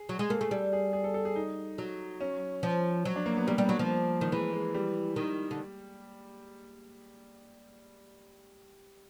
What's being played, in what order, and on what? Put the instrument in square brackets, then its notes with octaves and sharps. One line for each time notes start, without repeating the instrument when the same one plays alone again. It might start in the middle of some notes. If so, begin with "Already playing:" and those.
Already playing: [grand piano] G#4
[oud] F#3
[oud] G#3 [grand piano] G#4
[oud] A#3 [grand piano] A4
[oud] A3 [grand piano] G#4
[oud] G3 [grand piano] A4
[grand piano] G#4
G#4
A4
A4
G#4
D#4
[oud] F#3
[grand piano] C#4
[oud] F3
F#3
[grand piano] D4
A#3
B3
[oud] G3 [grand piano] A#3
[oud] G3
F#3
F3
D#3
[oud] E3 [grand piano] G#3
[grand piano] G#3
G3
[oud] D#3
D3